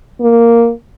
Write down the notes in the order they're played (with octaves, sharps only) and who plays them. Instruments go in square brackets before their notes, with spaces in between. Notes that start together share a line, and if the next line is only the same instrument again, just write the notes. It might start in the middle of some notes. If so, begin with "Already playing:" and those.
[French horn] A#3